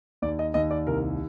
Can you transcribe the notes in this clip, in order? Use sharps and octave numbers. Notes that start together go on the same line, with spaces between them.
D#2 D5
D#5
D#2 D#5
D5
C2 A#4